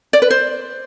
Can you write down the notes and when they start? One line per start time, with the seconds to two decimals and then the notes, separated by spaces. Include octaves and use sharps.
0.13 D5
0.22 B4
0.30 C5